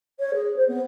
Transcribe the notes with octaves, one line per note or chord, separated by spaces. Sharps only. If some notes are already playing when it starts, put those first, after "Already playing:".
C#5
G#4
C5
B3